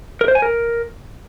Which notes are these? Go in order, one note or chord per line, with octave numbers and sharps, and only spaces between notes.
A#4
C5
G#5
A#4